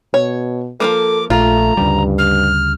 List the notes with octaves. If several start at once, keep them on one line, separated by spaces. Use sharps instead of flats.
B2 C#5
F3 A3 A#3 A4 D6
A#1 A3 F4 A#5
D2 G2 C#3 G3
F6